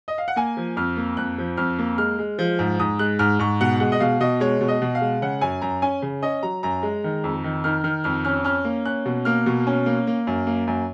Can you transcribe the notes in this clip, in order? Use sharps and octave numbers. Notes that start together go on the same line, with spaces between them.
D#5
F5
F#5
A#3 G#5
F3
F2 F6
A#3
F2 F#6
F3
F2 F6
A#3
G#3 F6
G#3
F3
G#2
G#2 D#6
G#3 F#6
G#2 F6
G#2 C#6
B2 F#5
G#3 F#5
D#5
B2 F5
B2 D#5
G#3 C#5
B2
D#5
B2
F5
G#3
C#3 F#5
F#2 G#5
F#2 A#5
C#4 G#5
C#3
C#4 D#5
F#3 A#5
F#2 A#5
G#3
D#3
F2
D#3
D#3 F6
D#3 F6
F2 F6
C#4 F6
C#4 F6
A#3
C#4 F#6
B2
A#3 F6
B2
C#4
A#3
A#3
F#2
A#3
F#2